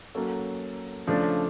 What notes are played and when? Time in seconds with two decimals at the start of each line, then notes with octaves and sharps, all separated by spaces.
0.15 F#3 A#3 C#4 F#4 A4
1.07 C#3 F3 A3 D4